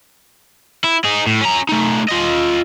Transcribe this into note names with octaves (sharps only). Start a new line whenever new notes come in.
E4
D#4 G#4
A2
C#4 A#5
A3 D#4
F4 D#5